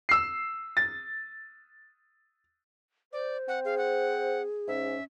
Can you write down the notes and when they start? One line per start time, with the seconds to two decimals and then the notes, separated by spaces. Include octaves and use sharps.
0.09 E6 C7
0.77 A6
3.13 C5 D5
3.48 C4 F#5
3.65 G#4 F5
3.78 F#5
4.68 G#2 C#4 E5